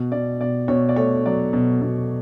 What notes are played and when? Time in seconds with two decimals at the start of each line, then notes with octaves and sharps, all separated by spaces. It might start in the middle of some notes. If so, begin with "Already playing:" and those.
Already playing: B2
0.12 B2 D5
0.40 B2 D5
0.68 B2 C#5
0.89 D5
0.96 A3 C#5
1.26 F#3 D5
1.53 B2
1.82 B2